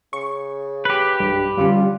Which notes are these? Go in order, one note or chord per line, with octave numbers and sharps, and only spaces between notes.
C#3 C#6
G4 B4
B1 G2
F2 D3 G3 C#4 F4